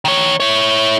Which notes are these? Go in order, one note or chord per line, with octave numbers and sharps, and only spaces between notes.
D#3 C#5
E4 C#5